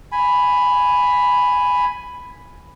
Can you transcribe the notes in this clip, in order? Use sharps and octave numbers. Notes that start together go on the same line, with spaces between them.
G#5 B5